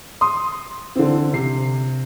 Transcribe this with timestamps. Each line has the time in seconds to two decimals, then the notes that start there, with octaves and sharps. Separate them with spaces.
0.21 C6 D#6
0.96 D3 E3 C4
1.33 C3 C7